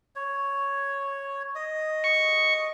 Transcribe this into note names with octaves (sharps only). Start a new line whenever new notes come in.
C#5
D#5
C#6